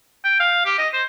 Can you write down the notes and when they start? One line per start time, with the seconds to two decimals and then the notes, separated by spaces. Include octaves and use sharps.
0.24 G5
0.40 F5
0.65 G4
0.78 D#5
0.93 C5